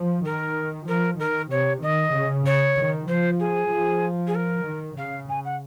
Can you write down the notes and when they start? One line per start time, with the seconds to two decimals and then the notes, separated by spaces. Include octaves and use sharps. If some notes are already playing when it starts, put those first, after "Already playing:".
Already playing: F3
0.24 D#3 A#4
0.87 F3 A#4
1.19 D#3 A#4
1.50 C3 C#5
1.82 D#3 D#5
2.13 C#3
2.46 C#5
2.77 D#3
3.08 F3 C5
3.39 G#4
3.71 F3
4.27 G#4
4.35 A#4
4.66 D#3
4.97 C#3 F5
5.28 G#5
5.44 F#5